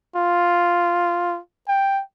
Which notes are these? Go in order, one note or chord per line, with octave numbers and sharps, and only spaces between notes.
F4
G5